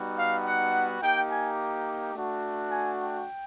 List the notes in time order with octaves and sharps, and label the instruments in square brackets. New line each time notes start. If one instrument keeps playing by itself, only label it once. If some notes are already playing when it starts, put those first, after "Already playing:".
Already playing: [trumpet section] G3 B3 D#4 F#4
F5
F#5
A#3 D#4 G4 G5
G#5
A3 D4 F#4
G#5
G5